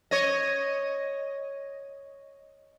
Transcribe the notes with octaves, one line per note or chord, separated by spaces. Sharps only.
C#5 D#5